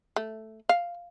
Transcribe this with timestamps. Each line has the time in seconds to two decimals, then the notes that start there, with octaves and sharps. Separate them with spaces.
0.16 A3
0.69 F5